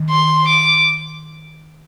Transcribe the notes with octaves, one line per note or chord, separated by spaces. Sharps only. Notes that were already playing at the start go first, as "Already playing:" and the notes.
Already playing: D#3
C6
D6